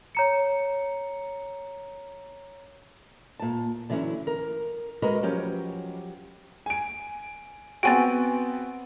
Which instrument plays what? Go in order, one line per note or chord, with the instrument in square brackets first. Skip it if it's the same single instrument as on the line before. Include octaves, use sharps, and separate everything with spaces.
[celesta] C#5 A#5 C#7
[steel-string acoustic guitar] A#2 A5
D3 E3 F#3 C#4 E4
A#4
G#3 F#4 A#4 B4 D#5
F3 F#3 C#4 G4
[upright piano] G#5 D7
[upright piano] B3 C4 F#4 [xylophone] G5 G#5 A6